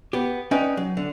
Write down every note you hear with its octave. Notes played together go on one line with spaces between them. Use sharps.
B3 G4
C#4 D#4 B4 D5 G5
F#3
D3